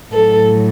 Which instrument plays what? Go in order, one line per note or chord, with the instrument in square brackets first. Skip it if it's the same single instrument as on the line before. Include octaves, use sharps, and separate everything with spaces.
[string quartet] A2 F#3 A4